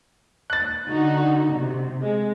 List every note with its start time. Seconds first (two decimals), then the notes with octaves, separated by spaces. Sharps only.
0.50 F#6 A6
0.87 D3 D#4 F#4
1.53 C3
2.01 G#3